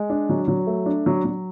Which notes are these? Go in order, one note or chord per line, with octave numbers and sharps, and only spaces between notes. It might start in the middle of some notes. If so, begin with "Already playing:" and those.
Already playing: G#3
D4
F#3
F#3
A3
D4
F#3
F#3